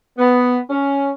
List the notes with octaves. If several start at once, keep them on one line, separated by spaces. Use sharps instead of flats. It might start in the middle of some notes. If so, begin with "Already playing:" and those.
B3
C#4